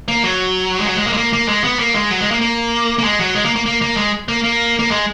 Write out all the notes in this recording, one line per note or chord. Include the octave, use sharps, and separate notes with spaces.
A#3
F#3
G#3
F#3
G#3
A#3
G#3
A#3
A#3
G#3
B3
A#3
G#3
F#3
G#3
A#3
A#3
A#3
G#3
F#3
G#3
A#3
A#3
A#3
A#3
G#3
A#3
A#3
A#3
G#3